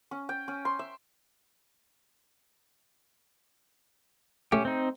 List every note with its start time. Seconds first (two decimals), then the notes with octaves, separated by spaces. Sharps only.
0.11 C#4
0.29 G5
0.48 C#4
0.65 C6
0.79 E5
4.52 A3 C#4 G4
4.65 C4 D#4